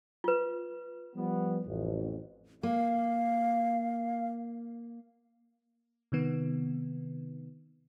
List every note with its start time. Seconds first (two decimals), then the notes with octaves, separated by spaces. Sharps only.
0.24 F4 B4
1.15 F3 G3 B3
1.66 A1 F2
2.63 A#3 F5
6.12 C3 D#3 B3